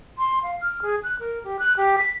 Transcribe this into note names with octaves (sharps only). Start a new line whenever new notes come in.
C6
F5
F6
G#4
F#6
A#4
G4
F#6
G4
B6